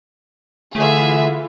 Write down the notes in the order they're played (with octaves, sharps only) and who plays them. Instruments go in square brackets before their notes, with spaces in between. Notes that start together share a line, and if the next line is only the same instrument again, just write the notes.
[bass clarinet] D3 [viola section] E3 F4 A4 [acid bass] A3 [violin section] G#4 E5